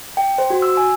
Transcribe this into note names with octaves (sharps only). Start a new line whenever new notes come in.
G5
C5
F#4
E6
G#5